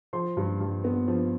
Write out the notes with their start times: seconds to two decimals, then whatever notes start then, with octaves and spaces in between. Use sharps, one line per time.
0.13 F3 C6
0.37 G2
0.60 G2
0.84 B3
1.08 F3